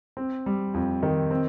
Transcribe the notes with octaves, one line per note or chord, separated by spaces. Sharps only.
C4
G3
F2
D#3
C4